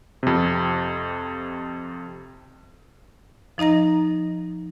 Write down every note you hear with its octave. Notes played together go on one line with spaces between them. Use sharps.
F2 C3
F3 D#4 D#5 A#5 A#6